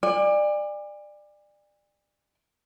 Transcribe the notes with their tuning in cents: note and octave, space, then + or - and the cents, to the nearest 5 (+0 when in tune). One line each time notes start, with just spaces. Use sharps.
D5 +25 G#5 -40